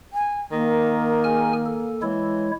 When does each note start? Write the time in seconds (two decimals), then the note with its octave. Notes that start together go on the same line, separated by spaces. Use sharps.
0.13 G#5
0.52 D#3 A#3
1.24 G#4 G#5 F6
1.66 A4
2.02 E3 G#3 E4 C#5